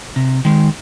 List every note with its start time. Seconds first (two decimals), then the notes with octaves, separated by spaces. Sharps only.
0.16 C3
0.45 D#3 G#3